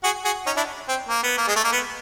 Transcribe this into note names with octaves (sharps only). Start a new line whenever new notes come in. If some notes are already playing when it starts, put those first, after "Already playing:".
F#4 G#4
F#4 G#4
C#4 D#4
D4 E4
C4
A#3
B3
A#3
G#3
A3
A#3
B3